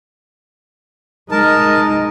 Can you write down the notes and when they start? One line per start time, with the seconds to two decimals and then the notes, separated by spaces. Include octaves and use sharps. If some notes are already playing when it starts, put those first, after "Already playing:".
1.31 G#3 D#4 A#4 A5